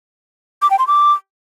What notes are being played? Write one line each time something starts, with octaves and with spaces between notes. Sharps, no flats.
D6
G5
C6
D6